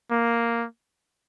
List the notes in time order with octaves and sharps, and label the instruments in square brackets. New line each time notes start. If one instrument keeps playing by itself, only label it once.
[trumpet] A#3